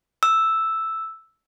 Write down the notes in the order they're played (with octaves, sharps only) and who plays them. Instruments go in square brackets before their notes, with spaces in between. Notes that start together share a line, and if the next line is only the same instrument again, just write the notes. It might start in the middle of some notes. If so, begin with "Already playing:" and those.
[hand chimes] E6